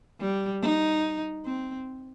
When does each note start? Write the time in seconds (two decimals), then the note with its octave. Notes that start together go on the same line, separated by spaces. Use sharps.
0.20 G3
0.62 D#4
1.45 C4